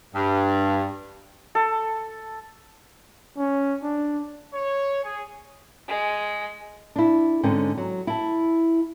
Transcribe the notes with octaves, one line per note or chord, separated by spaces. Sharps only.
G2
A4
C#4
D4
C#5
G#4
G#3
D4 E4
G#2 D3 C4 C#4
F#3
E4 A5